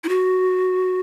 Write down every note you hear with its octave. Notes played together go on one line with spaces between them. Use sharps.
E4
F#4